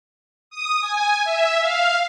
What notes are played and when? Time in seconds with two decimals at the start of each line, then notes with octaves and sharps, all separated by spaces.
0.50 D#6
0.81 G#5
1.24 E5
1.61 F5